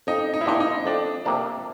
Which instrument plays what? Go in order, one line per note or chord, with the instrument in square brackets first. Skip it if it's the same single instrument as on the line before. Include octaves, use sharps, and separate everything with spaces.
[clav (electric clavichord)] F2 [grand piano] D#4
[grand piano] D#4
E4
[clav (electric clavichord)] C3 F3 A#3 D4 [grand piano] D#4
[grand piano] D#4
[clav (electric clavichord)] F2 [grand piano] D4
[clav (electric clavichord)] C3 F3 A#3 D4